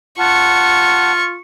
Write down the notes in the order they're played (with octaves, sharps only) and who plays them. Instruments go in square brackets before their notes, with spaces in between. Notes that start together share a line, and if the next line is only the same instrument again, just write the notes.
[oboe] F4 [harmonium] F#5 A5 [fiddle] C#6